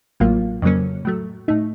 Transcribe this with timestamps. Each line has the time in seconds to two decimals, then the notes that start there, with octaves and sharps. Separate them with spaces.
0.20 A1 A2 F#3 A#3 F4
0.62 F2 C#3 F#3 A#3 C#4
1.05 A2 F#3 A3
1.48 A2 A3 D#4